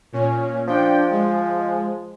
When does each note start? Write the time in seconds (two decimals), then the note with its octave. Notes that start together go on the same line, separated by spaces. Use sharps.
0.12 A#2 C#4
0.67 F3 D4 G5
1.11 G#3